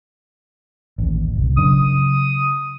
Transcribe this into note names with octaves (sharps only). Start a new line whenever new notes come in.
A1 D#2
F#1 C2
C#3 F#3 D4 D#6